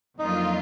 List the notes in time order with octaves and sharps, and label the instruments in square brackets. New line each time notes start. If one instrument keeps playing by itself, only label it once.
[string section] F2 D3 F#3 A#3 F4 [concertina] D#4